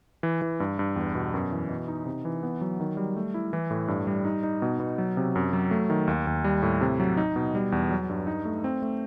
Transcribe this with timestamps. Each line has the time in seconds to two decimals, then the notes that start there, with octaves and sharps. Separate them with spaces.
0.23 E3
0.42 E3
0.60 G2
0.79 G2
0.96 E2
1.15 B2
1.34 F#2
1.52 E3
1.69 B2
1.88 D#4
2.06 C3
2.25 E3
2.43 B3
2.61 F#3
2.80 D#3
2.97 G3
3.16 A3
3.34 E4
3.53 E3
3.71 A2
3.88 G2
4.07 G3
4.25 D#4
4.43 D#4
4.62 B2
4.80 B2
4.98 F#3
5.17 C3
5.36 F#2
5.53 F#3
5.71 A3
5.90 D#3
6.07 D#2
6.27 D#2
6.44 G3
6.62 A2
6.81 C3
7.00 F#3
7.17 D#4
7.36 B2
7.55 G3
7.72 E2
7.90 F#3
8.09 G2
8.27 D#4
8.45 A3
8.64 C4
8.82 A3